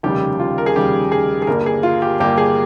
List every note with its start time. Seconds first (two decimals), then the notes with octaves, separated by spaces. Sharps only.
0.03 F1 D#2 C#3 G3 G4
0.40 F4
0.58 A#4
0.66 G#4
0.75 F1 D#2 C#3 G3 G4
1.12 G#4
1.42 G#4
1.47 G1 G2 G3 A#3 A#4
1.66 G#4
1.83 F4
2.02 G4
2.20 G1 G2 G3 A#3 G4
2.38 G#4